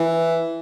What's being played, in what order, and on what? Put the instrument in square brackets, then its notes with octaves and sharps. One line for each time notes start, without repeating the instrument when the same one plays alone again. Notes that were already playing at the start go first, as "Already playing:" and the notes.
Already playing: [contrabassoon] E3